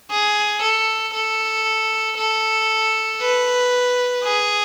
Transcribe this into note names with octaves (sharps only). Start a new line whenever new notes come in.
G#4
A4
A4
A4
B4
G#4